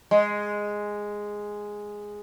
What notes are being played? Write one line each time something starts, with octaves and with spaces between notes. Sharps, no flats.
G#3